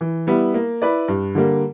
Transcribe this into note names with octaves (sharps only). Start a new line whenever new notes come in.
E3
G3 B3 E4
A#3
E4 B4 D5
G2
D3 G3 A#3